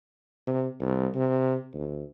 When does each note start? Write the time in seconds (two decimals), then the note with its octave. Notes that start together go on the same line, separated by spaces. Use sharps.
0.47 C3
0.80 C2
1.15 C3
1.74 D2